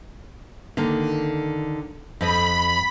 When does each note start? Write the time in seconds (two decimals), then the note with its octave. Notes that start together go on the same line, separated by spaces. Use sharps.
0.77 D3 D#3 A#3
2.21 F2 D#5 B5